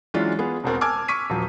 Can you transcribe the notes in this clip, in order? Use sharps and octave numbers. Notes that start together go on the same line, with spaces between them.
E3 F#3 G#3 C#4 D4 F4
B3 F4 G#4
E1 B2 C4 A#4
G#5 A5 D6 E6 F6 G#6
C#6 D6 B6 D#7
D#1 F3 F#3